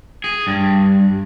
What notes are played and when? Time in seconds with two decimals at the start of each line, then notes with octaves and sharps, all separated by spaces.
0.24 G#4
0.47 G2